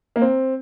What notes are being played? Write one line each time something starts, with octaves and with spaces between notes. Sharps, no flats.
A#3
C4